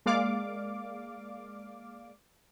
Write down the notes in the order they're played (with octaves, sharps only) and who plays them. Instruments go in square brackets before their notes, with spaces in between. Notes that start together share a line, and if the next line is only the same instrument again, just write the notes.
[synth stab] G#3 A#3 D5 F5 D6